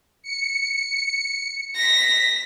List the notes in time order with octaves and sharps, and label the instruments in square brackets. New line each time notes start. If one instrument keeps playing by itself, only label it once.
[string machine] C#7
[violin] A#6 [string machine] B6